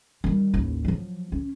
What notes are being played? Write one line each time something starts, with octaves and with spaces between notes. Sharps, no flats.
D#3 G3
A1 D#2
F3 F#3
C#4